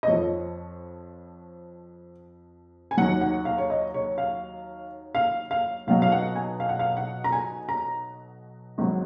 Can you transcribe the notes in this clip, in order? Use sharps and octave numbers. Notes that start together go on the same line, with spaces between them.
D#5
F2 F3 C#5
G#5
D#2 D#3 F#3 F#5
F#5
F5
C#5
D#5
C#5
F5
F5
F5
B1 B2 F#3 F5
F5
F#5
G#5
F5
F#5
F5
F#5
A#5
G#5
A#5
G#1 G#2 D#3 F#3